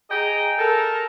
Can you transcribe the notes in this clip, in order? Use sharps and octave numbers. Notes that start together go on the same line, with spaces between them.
G#4 D#5 G5 A#5
A4 A#4